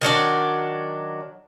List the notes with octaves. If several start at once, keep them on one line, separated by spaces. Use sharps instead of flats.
D#3 F#3 D4 D5